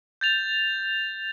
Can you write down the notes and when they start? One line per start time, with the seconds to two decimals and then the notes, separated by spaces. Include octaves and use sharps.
0.21 G6 A6 F7